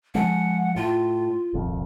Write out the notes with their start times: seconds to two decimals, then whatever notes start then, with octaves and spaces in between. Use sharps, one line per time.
0.15 F3 G#3 F#5
0.76 A2 F4
1.53 D#1 C2 F2